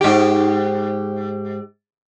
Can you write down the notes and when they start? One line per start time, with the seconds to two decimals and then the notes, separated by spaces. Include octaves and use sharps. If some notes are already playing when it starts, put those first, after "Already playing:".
0.01 G#2 G4